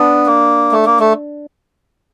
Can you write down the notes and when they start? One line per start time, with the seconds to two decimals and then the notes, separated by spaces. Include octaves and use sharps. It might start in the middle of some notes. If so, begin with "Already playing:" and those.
Already playing: B3 D4
0.26 A#3
0.72 A3
0.85 A#3
1.00 A3